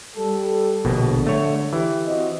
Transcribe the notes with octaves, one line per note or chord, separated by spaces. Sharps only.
G3 A4
A#1 B2 D3
A3 C#5
E3 G4
C4 F#4 D#5